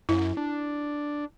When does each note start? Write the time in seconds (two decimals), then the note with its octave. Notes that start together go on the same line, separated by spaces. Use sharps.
0.09 F#2 E4
0.37 D4